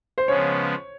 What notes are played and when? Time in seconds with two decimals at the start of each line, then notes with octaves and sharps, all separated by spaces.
0.18 C5
0.27 C#3 F3 G#3 B3 C#5